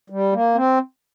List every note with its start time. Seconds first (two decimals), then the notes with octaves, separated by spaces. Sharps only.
0.10 G3
0.33 A#3
0.55 C4